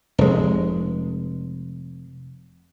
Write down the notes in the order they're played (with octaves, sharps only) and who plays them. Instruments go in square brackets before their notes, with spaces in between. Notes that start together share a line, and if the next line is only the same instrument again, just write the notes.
[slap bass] F1 G#3